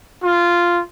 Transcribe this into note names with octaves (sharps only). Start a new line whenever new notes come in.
F4